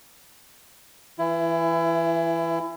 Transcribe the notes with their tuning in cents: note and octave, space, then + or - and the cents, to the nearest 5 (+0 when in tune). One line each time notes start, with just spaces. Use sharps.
E3 +0 E4 +25